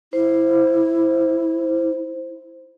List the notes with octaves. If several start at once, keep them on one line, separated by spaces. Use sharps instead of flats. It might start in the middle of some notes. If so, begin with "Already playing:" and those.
E4 C5